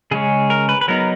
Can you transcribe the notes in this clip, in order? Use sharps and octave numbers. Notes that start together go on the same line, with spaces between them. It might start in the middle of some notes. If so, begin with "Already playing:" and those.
C#3 G#3 C#4 G#4
A#4
B4
B4
F#3 B3 D#4 A#4